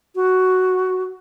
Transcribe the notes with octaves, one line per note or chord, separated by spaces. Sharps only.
F#4